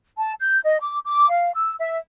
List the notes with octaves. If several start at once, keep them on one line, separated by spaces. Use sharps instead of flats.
A5
G6
D#5
D6
D6
F5
E6
E5